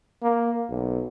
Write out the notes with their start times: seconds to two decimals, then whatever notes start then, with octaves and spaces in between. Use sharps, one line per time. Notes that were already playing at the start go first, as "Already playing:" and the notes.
0.23 A#3
0.69 B1